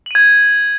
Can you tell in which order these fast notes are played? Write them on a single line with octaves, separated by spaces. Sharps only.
F#7 D#7 G#6